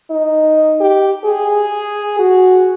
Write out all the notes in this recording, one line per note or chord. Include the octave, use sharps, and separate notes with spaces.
D#4
G4
G#4
F#4